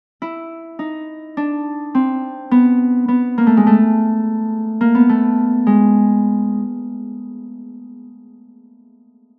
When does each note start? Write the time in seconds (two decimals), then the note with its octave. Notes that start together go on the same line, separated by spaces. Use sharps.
0.22 E4
0.79 D#4
1.37 D4
1.95 C4
2.51 B3
3.08 B3
3.38 A#3
3.47 A3
3.57 G#3
3.67 A3
4.81 A#3
4.95 B3
5.09 A3
5.67 G#3